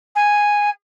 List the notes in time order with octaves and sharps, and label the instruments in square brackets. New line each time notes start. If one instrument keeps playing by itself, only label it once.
[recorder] G#5